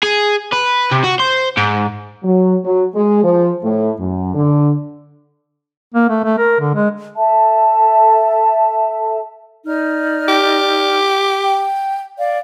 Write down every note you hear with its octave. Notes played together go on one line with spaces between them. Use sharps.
G#4
B4
C3
F#4
C5
G#2
F#3
F#3
G#3
F3
A2
F#2
D3
A#3
A3
A3
A#4
D3
G#3
A4 E5 A5
D#4 D5 F6
G4
G5
D5 F5